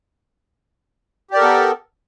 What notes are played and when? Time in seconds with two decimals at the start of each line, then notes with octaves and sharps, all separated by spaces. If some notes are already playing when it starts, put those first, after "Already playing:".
1.31 G4
1.34 D5
1.36 A#4
1.39 A4
1.42 B3